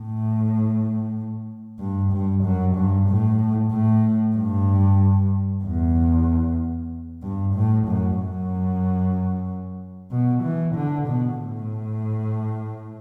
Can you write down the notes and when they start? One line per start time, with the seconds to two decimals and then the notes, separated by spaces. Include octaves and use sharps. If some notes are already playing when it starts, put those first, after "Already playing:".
Already playing: A2
1.80 G2
2.12 G2
2.44 F#2
2.76 G2
3.08 A2
3.71 A2
4.36 G2
5.64 E2
7.23 G2
7.55 A2
7.87 F#2
8.19 F#2
10.11 B2
10.43 E3
10.75 D3
11.07 B2
11.39 A2